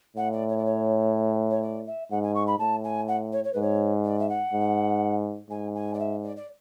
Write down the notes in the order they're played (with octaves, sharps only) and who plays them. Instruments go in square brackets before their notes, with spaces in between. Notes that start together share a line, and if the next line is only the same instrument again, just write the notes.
[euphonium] A2 [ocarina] F#5
[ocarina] D5
C#5
D5
C#5
C#5
D5
E5
[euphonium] G#2 [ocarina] F#5
[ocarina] G#5
C#6
B5
[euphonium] A2 [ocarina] A5
[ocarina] G#5
F#5
C#5
C#5
[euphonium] G#2 [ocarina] B4
[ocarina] C#5
D5
E5
F#5
[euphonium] G#2
[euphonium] G#2 [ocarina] G#5
[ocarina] G#5
D5
E5
D5
D5